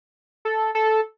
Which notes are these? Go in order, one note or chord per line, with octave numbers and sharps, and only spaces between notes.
A4
A4